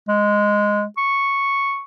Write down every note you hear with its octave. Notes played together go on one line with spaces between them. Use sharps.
G#3
C#6